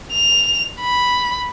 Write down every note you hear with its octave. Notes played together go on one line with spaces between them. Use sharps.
F7
B5